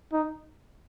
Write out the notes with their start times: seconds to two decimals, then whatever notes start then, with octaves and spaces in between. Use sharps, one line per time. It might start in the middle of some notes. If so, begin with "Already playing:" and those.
0.13 D#4